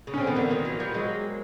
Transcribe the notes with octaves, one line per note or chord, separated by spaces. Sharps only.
C#3
C#4
D3 C4
D#3 B3
D3 E3 A#3
D#3 F3
E3 F#3
F3 G3
F#3 G#3